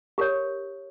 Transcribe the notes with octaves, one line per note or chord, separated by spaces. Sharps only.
G4 A#4 C#5